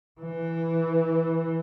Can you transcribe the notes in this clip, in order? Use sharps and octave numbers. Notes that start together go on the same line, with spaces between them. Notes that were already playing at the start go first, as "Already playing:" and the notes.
E3